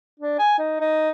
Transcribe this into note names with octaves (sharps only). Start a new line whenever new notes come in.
D4
G#5
D#4
D#4